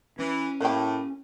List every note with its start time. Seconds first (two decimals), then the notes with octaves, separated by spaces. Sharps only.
0.19 E3 C#4
0.61 A2 A#3 G4